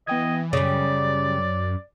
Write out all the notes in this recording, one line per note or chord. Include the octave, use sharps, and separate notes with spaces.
E3 B3 D#5 G5 G#6
F#2 C#3 G3 C#5 D5